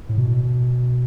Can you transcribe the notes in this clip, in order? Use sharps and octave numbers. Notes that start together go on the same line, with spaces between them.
A2
B2